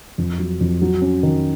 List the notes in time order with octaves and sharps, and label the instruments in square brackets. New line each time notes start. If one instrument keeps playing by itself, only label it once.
[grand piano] F2
F#3
F2
F#3
C#4
D#3